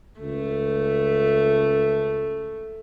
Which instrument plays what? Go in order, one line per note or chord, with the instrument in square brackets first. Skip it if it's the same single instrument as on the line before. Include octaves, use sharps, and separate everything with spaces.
[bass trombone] C#2 [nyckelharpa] A3